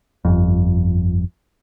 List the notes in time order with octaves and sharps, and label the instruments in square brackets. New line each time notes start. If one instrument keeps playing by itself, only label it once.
[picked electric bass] G1 F2